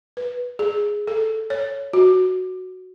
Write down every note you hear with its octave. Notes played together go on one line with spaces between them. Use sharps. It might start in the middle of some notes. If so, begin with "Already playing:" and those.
B4
G#4
A4
C#5
F#4